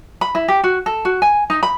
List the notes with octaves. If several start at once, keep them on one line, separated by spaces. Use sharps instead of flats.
B5
E4
G4
F#4
A4
F#4
G#5
D#4
B5